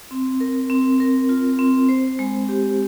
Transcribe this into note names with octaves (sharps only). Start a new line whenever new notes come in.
C4
A#4
C4
A#4
F4
C4
C5
G#3
G4